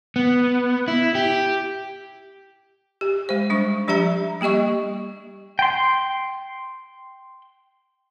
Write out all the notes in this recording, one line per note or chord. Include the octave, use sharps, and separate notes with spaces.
B3
E4
G4
G4
G#3 C5
G3 D4 C#6
F3 D4 G4 E5 A#5
G3 A#3 G4 D#5 C#6
G5 C6